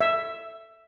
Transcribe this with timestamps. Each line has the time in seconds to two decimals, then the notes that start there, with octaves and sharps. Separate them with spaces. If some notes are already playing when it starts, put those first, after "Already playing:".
0.01 E5